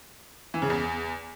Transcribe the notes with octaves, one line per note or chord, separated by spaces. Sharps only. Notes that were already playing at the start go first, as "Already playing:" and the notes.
E3
C#3
E2